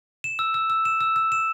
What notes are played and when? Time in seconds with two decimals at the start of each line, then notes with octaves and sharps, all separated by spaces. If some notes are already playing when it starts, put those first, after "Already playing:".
0.24 E7
0.39 E6
0.54 E6
0.70 E6
0.85 E7
1.01 E6
1.16 E6
1.32 E7